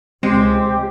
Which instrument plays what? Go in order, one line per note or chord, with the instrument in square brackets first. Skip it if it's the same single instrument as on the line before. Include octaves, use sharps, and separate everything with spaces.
[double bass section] C#2 C3 [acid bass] G#3 [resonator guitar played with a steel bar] C4 [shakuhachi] G4